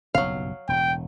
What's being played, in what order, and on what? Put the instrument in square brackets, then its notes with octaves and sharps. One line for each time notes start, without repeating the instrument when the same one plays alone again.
[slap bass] F#1 B1 G2 [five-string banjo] F#3 F5
[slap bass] E1 A2 [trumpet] G5